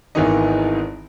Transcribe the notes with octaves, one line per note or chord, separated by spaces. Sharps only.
G#1 D#3 E3 B3 D#4 D#5